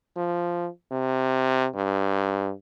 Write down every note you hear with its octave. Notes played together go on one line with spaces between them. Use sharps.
F3
C3
G2